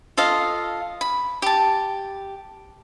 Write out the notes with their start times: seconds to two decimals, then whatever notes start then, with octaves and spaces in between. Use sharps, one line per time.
0.17 F4 A4 D#5 F5
1.01 B5
1.42 G4 A5